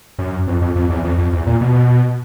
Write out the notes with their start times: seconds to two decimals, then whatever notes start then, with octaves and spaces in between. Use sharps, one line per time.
0.19 F#2
0.47 F2
0.62 F2
0.76 F2
0.90 E2
1.04 F2
1.18 F2
1.33 E2
1.47 A#2
1.61 B2